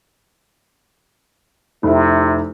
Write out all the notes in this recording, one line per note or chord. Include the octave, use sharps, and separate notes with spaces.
F1 C3 E4